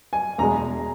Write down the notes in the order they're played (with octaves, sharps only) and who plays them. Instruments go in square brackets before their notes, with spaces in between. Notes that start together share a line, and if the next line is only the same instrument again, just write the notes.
[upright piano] G#5
[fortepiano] E2 B2 G#3 [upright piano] A#5